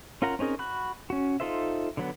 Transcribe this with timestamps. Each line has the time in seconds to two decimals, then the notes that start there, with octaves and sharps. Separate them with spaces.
0.22 C#4 F4 A#4 F#5 A#5
0.39 C4 C#4 D#4 G#4 A#4
0.59 F#4 B5 F#6
1.10 C#4 F#4
1.40 D#4 F4 A4 C5 E5
1.97 D3 F#3 B3